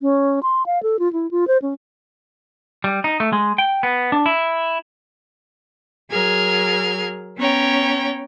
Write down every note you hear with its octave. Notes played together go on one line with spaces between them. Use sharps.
C#4
C6
F5
A4
F4
E4
F4
C5
C#4
G3
D#4
A3
G#3
G5
B3
D4
E4
F#3 G#4 A#4 F6 G#6
B3 C#4 C#5 G5 A#5